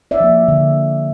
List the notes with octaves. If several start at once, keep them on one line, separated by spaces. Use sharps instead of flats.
D5 E5
F3 A#3
D3